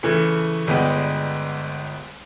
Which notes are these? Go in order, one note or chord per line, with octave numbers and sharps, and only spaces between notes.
C#3 E3 A3
G1 G3 G#3 B3 G5